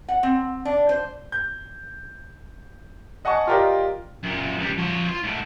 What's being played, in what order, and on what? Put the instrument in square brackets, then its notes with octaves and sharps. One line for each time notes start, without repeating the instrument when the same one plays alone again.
[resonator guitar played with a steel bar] F#5
C4
D4
C5
[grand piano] G6
D#5 F#5 G#5 A5 C#6
F4 G4 A#4 D5 D#5
[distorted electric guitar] F#2 A#2
C#2 G3
F3 C#5
F4
G#2 A3